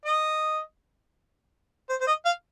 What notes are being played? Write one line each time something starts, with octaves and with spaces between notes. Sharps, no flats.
D#5
C5
C5
D#5
F5